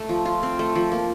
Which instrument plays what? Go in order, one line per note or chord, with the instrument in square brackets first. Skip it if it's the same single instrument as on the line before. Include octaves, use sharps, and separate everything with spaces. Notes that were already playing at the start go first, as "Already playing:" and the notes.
Already playing: [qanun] A3
F3
F4
C4
A3
F3
A#3